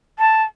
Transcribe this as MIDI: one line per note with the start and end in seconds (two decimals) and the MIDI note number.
0.19 0.43 81